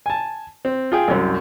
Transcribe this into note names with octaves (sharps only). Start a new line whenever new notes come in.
G#5 A5
C4
F4 G#4 G5
C2 F#2